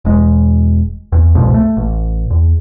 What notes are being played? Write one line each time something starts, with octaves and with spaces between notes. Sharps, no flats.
E1 G#3
E2
C2 F2 G#2 B2
A3
A1
E2